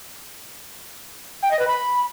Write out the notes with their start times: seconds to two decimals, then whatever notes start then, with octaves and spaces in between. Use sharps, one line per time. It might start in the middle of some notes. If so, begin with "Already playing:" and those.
1.43 G5
1.51 D#5
1.59 B4
1.67 B5